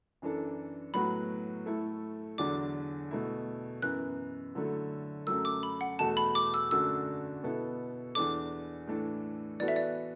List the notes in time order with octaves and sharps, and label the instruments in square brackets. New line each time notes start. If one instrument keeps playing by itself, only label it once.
[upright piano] F#2 E3 D4 A4
[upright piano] A2 F#3 B3 F#4 [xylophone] B5
[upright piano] A2 A3 E4 A4
[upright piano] E2 D3 F#3 D4 A4 [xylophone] D6
[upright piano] B2 A3 E4
[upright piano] F#2 E3 B3 [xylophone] F#6
[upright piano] D3 F#3 A3 E4 A4
[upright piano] F#2 F#3 A3 [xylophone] E6
[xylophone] D6
B5
F#5
[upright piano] E2 B2 A3 F#4 A4 [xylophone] A5
[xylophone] B5
D6
E6
[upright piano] F#2 D3 A3 D4 F#4 [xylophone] E6
[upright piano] B2 B3 E4 A4
[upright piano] E2 E3 D4 A4 [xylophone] D6
[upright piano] A2 E3 D4 A4
[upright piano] E3 B3 F#4 A4 [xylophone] D5
[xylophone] E5
D5